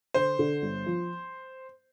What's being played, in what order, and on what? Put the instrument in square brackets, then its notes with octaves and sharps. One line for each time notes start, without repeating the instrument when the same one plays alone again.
[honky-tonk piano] D3 [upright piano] C5
[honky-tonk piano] D3
G1
F3